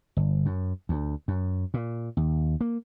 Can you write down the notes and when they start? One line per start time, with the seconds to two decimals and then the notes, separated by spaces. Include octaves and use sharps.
0.17 G1
0.46 F#2
0.89 D2
1.28 F#2
1.74 A#2
2.17 D#2
2.61 A#3